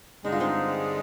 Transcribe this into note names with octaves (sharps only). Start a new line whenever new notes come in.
G2 D3 G#3 D#4
F4
C4 D#4